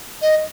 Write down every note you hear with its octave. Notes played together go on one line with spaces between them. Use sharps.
D#5